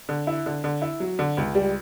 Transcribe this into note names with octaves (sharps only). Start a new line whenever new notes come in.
D3
E4
D3
D3
E4
F#3
D3
C#2
G3